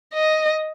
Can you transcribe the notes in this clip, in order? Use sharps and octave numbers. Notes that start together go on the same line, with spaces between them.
D#5